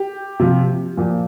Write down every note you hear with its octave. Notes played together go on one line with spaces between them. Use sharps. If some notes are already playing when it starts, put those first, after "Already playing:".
Already playing: G4
C3 F3
A#2 F3